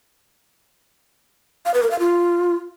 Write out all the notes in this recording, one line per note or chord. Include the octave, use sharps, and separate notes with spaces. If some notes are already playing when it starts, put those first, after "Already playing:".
F5
B4
A#4
F5
F4